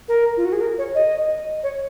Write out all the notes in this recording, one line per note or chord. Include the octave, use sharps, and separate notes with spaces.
A#4
F4
F#4
G#4
A#4
C#5
D#5
C#5